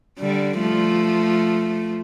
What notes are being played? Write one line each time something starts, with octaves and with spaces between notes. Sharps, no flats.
D3 G3
F3 A3